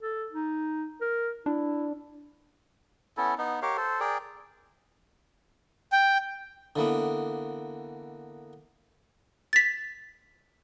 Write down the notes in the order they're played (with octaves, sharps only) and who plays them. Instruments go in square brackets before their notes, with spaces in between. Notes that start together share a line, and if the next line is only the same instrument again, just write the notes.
[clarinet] A4
D#4
A#4
[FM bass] D4 [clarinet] E4
[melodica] B3 C#4 E4 A4
B3 D#4
G4 A#4 C#5 F5
A4 C5
G#4 A#4 D5 G5
[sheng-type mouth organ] G5
[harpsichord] D3 E3 A#3 B3
[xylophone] A6 B6